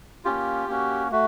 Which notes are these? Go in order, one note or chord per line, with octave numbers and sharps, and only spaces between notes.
A#3 C#4 F4 G4
A#3 C#4 F#4
A3 F#4